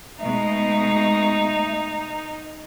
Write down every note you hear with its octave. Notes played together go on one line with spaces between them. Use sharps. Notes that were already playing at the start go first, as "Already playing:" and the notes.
B2 G#3 A3 D#4